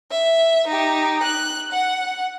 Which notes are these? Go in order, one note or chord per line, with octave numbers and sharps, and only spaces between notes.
E5
D#4 G4
F#6
F#5